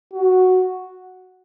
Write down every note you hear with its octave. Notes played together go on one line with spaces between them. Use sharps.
F#4